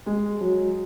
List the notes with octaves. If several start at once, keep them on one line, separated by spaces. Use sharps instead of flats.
G#3
F#3